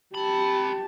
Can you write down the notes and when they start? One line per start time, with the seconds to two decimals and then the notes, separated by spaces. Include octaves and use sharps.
0.15 C4 G4 A5 B5